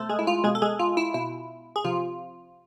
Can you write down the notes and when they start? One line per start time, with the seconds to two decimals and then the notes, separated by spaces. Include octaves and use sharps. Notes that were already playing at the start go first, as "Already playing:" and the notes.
Already playing: B2 A3 A4 C5
0.09 G#3 G#4
0.19 E4
0.27 F4
0.44 B2 G#3 G#4
0.55 A4
0.62 G#3 G#4
0.79 F4
0.97 E4
1.14 B2 E4
1.76 G#4
1.84 C3 F3 F4